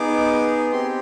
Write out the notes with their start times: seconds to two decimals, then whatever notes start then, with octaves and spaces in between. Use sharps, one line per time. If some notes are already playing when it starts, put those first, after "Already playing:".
Already playing: B3 D#4 G#4 D6
0.71 C4 G4 C6